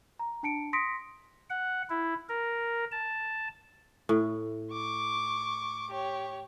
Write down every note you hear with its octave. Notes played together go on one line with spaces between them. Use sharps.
A#5
D4 A5 C#7 D7
C6 D#6 A#6 B6 C#7 D7
F#5
E4
A#4
A5
A2
C#6 D6
G4 C#5